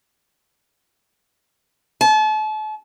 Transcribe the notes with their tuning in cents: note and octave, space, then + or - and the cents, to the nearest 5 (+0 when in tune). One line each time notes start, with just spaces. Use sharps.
A5 -35